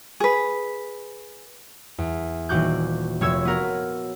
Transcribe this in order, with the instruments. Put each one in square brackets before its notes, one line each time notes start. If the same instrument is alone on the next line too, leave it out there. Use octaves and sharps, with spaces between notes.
[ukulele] G#4 B4
[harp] E2
D#1 E3 F#4 D6 F#6 G6
F1 C#5 E6 G#6
B3 F#4 A#4